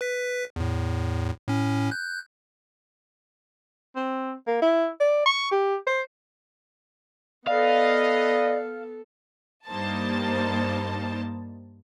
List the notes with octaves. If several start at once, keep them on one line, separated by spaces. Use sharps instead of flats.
B4 B6
E2 A2
A2 C#4
F#6 G6
C4
A#3
E4
D5
C#6
G4
C5
B3 A4 B4 D5 D#5 F5
G2 G3 A#3 D#4 C5 A5